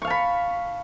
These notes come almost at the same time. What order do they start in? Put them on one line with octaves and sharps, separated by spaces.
C#6 F5 A5 B5